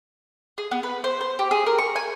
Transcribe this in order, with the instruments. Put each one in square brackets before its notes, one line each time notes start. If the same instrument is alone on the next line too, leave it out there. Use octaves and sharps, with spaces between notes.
[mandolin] G#4
B3
B4
C5
C5
G4
G#4
A#4
C#6
G#5